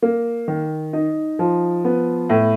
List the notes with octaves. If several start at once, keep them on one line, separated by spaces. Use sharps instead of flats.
A#3
D#3
D#4
F3
B3
A2